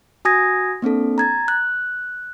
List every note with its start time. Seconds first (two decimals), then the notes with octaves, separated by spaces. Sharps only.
0.25 F#4 G#5 D#6 G#6 A#6
0.82 A#3 C4 D4 A4
1.18 A#5 G#6 A6
1.48 F#6